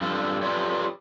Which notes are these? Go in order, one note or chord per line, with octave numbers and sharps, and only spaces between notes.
G2 D3 F4 A4
F4 G4 A4 B4 C#5 D5